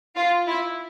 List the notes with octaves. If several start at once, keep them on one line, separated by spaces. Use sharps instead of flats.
F4
E4